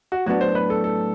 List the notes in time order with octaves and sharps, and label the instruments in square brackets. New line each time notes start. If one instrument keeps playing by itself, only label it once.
[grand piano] F#4
[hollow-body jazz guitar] A2 F#3 B3 D4 [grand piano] F#4
[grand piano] C5
B4
A4
A4